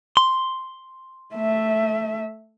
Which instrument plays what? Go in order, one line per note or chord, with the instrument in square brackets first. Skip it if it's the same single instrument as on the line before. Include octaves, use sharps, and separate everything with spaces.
[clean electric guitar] C6
[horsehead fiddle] A3 E5